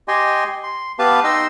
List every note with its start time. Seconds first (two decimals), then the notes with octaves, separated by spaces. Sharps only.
0.08 G4 D#5 G5 G#5 C6
0.64 C6
0.99 B3 G4 B4 F5 A5
1.24 D#4 D#5 G5 C6 E6